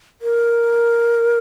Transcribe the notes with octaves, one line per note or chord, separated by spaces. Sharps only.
A#4